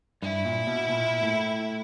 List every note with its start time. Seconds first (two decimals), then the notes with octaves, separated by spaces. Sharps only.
0.22 G2 E4
0.45 A#2
0.67 B2
0.89 A#2
1.23 A2